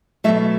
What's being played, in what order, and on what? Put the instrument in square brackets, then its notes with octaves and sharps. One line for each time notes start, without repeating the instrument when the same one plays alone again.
[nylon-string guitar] B2 F#3 A3 E5